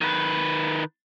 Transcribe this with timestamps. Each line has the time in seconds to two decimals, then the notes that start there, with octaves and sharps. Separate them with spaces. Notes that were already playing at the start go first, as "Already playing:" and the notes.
0.01 D#3 B4